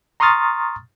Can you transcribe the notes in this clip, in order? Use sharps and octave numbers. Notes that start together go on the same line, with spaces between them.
A#5 C6 C#6 D#6 F6 A6